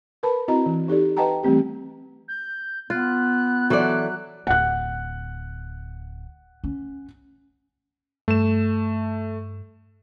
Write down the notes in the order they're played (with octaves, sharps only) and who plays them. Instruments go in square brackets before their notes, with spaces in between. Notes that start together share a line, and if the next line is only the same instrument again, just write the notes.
[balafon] A#4 B4 A5 B5
C4 E4 F#4 D#5 A#5
E3
D#4 G4 A4 D5
B4 D#5 F#5 G5 A5 A#5
E3 G3 A3 C4 G4
[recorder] G6
[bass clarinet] B3 [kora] F4 [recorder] F#6
[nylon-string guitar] E3 A4 D5 [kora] F#3
[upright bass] D1 [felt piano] F#5 F#6
[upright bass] C#4
[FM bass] G2 [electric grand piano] A3 E7